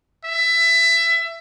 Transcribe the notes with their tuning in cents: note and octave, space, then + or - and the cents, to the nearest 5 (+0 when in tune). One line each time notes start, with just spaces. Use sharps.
E5 +20